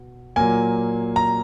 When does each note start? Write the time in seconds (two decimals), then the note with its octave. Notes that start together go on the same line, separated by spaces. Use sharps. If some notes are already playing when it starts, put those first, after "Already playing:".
Already playing: B2
0.36 A#2 F#3 A#3 G#5
1.16 A#5